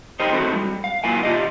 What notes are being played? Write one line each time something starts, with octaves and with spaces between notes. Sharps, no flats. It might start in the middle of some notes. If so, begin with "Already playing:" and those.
D#4 G4 A#4 C5 D#5
A3 C4 D#4 E4 F#4 A4
G3
F5
F#3 A#3 E4 F4 G#5
F4 G4 D#5